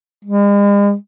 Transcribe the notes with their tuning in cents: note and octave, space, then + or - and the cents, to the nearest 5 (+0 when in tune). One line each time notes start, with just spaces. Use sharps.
G#3 -45